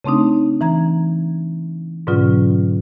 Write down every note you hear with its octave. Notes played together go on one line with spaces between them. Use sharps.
C#3 A3 C4 D4 D#4
E3 A#5 G#6
G#2 B2 D3 F#3 C#4 F4